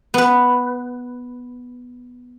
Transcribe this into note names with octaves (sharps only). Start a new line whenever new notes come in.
B3 B4